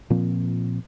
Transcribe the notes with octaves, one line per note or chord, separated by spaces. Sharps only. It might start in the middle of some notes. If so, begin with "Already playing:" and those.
A#2 F3 C4